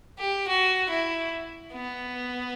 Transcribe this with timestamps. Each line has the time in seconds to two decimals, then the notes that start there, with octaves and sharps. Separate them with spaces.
0.19 G4
0.48 F#4
0.90 E4
1.73 B3